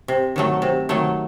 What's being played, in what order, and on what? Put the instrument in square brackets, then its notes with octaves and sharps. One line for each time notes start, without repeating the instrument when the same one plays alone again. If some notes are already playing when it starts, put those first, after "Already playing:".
[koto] C3
D#3 F#3 A3
C3
D#3 F#3 A3